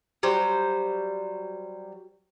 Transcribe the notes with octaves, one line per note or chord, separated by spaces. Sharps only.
F#3 G3 C5